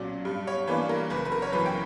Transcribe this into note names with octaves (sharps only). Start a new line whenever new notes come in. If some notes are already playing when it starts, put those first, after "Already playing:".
Already playing: B1 A#2 F#3 C#4 D5
G2
C#5
E3 A#3 D4 B4
A#4
F#1 B4
B4
A#4
C#5
F#2 E3 B4
G5